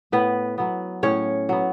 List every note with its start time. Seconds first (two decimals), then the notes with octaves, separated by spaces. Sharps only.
0.12 A2 B3 B4
0.58 F#3 B3
1.03 A2 C#4 C#5
1.49 F#3 B3